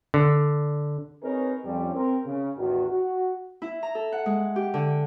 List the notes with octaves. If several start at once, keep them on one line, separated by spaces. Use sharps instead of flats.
D3
C4 D#4 G#4 A#4 B4 C#5
F2 G3 C#4
C4 A#4
C#3
A1 E2 D#3 F#4
F#4
E4
A#5
A4
F#5
G#3
G4
D3